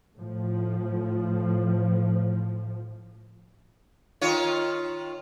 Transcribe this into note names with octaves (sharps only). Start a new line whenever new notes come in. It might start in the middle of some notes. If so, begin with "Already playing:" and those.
A2 F3
D#3 F4 C#5